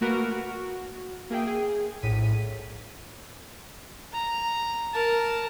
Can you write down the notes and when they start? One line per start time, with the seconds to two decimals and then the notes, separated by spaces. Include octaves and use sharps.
0.01 A3 A#3 F#4 A#4 B4
0.31 F#4
1.30 A#3 G#4 E5 G5
1.47 G#4
2.03 A#1 A2 B6 D#7
4.13 A#5
4.94 A#4 A5